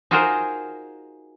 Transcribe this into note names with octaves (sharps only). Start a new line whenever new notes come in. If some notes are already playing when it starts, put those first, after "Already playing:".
D#4 F4 F#4 G#4 A#4 C5